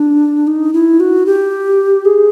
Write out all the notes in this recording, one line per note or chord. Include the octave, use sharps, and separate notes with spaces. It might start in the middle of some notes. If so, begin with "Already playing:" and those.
Already playing: D4
D#4
E4
F#4
G4
G#4